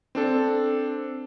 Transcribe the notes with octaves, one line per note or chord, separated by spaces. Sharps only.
C4 D4 A4